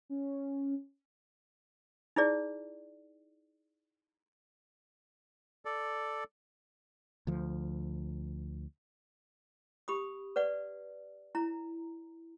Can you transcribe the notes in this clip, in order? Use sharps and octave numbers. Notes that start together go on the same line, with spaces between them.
C#4
D#4 E4 G#4 D5
A4 D5
D2 F3
G4 B5 D#6
B4 D5 F#5
E4 A#5